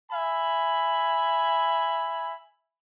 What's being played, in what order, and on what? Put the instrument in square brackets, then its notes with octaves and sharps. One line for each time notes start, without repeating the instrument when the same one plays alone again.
[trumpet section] E5 G#5 B5